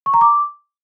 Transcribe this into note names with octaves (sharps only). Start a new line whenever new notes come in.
C#6
A#5
D6